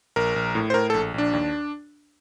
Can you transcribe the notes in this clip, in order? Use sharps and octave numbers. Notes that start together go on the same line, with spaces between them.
A#1 A#4
A#1
A2
C5
A2 A#4
A#1 A4
A#1 D4
D#2